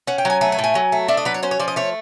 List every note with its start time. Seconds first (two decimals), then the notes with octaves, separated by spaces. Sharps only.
0.07 C#4 F#5
0.18 G5
0.25 F#3 G#5
0.41 A3 G#5
0.52 G#5
0.59 A2
0.64 G#5
0.75 F#3
0.92 A3
1.08 D4 E5
1.17 D#5
1.25 F#3 B4
1.34 C#5
1.43 C#4 C5
1.51 C#5
1.60 F3 D5
1.68 D#5
1.76 A3 C#5